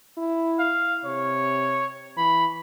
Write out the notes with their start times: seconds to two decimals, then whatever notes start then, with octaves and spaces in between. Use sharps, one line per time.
0.18 E4
0.59 F5
1.05 C3 C#5
2.17 E3 B5